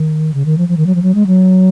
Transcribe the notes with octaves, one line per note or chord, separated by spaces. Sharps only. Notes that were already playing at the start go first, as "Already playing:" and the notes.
Already playing: D#3
C#3
D#3
F3
F3
D#3
F#3
F3
F#3
G#3
F#3